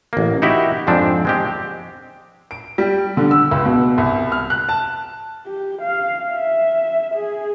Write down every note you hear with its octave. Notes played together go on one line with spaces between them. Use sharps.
A1 A#3
D#4 E4 F#4 G4 E5
F2 G#2 F3 C4 D4
G#3 C4 G4
D7
G3
D3
E6
C#2
B2
C2
F6
F#6
A5
G4
F5
E5
G#4